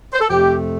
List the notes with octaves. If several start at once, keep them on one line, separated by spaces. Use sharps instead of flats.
C5
A4
F2 C3 A3 G4